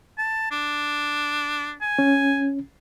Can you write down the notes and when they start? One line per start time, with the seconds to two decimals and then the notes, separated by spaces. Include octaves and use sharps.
0.18 A5
0.51 D4
1.81 G#5
1.99 C#4